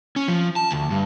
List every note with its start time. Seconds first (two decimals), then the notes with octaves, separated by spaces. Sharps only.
0.16 C#4
0.28 F3
0.56 A5
0.71 D2
0.90 G2